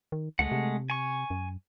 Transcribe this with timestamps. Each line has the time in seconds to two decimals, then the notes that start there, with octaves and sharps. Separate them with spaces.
0.12 D#3
0.39 C#2 G#3 A3 F#5
0.52 C3
0.90 G#5 C#6
1.30 F#2